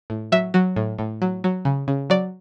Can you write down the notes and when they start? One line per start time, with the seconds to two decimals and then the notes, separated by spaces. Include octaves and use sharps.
0.10 A2
0.32 F#3 E5
0.54 F#3
0.76 A2
0.99 A2
1.22 F#3
1.44 F#3
1.65 C#3
1.88 C#3
2.10 F#3 D5